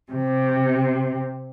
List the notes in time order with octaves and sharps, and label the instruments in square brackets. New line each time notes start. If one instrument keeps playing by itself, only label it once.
[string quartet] C3